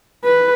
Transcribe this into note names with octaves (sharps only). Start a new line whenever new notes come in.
B4